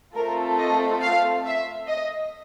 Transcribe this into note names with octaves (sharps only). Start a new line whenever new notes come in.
A3 C4 F4 A4 A#4
D#5
F5
E5
D#5